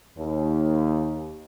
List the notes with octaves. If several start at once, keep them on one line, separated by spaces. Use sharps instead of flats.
D#2